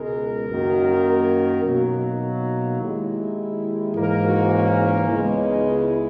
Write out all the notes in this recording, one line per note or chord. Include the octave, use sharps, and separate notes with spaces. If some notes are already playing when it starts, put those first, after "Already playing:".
Already playing: C#2 B2 G#3 A#4
F#2 D#3 F#3 A#3
A#4
B2 F#3 A#3 F#4
D#4
D#2 D#3 G#3 E4
G#2 E3 A#3 A#4
F#4
C#4
C#4
C#2 C#3 G#3 B3 C#4
D#4
E4